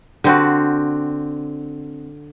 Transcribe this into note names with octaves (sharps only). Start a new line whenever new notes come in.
D3 C4 F#4